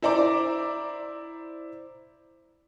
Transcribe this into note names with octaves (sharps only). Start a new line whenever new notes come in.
E4 C5 D5 A#5 D6